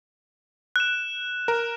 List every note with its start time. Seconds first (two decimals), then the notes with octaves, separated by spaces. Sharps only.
0.76 F#6 E7
1.48 A#4